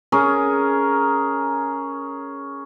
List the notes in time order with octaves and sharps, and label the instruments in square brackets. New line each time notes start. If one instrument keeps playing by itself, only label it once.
[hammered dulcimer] C#4 G#4 A#4